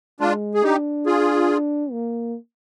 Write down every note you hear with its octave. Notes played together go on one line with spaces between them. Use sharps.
G#3 D4 F4
G#4
D4 D#4 G4
F4 G#4
A#3